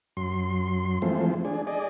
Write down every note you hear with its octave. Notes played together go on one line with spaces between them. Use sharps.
F#2 C6
E3 F3 G#3 A3 C4
D4 G#4
G#4 D5 D#5